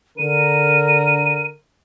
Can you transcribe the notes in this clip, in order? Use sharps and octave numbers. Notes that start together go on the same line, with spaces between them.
D3 A#4 D#7